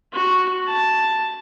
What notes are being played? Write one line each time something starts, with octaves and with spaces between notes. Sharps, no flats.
F#4
A5